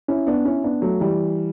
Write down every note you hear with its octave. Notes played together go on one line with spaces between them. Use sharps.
C#4 E4
B3 D4
C#4 E4
B3 D4
F#3 A3
E3 G3